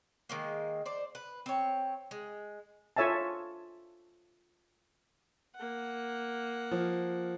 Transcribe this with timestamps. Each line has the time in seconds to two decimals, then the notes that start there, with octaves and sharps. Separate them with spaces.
0.29 D#3 G#3 A#3
0.86 C5 D5
1.15 B4
1.46 C4 C#5
2.11 G#3
2.96 F4 A4 C#5 E5 G#5 A5
5.56 A#3 F#5
6.71 F3